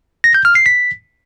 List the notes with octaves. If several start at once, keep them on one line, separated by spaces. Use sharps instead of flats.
A#6
G6
F6
C7
B6